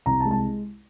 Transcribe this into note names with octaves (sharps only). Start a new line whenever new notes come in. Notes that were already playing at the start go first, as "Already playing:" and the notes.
C2 A#5
A5
G#3
A5